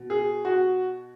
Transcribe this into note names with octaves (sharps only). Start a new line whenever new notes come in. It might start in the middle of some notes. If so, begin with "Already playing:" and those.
Already playing: B2
G#4
F#4